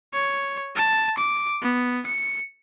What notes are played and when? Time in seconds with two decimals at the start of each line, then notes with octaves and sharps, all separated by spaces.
0.14 C#5
0.76 A5
1.18 D6
1.62 B3
2.06 C#7